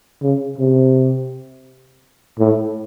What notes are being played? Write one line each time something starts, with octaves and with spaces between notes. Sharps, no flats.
C#3
C3
A2